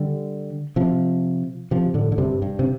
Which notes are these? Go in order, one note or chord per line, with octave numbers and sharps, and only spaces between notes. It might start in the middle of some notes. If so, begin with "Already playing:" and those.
Already playing: D3 G3
C3 F3
C3 F3
A2 D3
D3
G2 C3
G2
C3